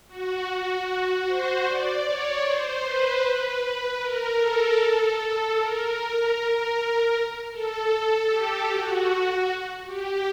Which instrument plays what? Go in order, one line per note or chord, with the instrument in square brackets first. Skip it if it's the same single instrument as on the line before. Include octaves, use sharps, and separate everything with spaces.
[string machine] F#4
C5
D5
C#5
C5
B4
B4
A#4
A4
A4
A#4
A#4
A4
A4
G4
F#4
G4